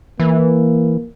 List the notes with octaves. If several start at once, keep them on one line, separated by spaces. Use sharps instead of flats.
E3 A#3